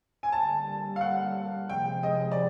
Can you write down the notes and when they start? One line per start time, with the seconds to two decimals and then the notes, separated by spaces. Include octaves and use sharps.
0.23 G#5
0.32 D3 G3 A#3 A5
0.96 F5
1.01 F#5
1.68 C3 F3 G#3 G5
2.03 D#5
2.31 D5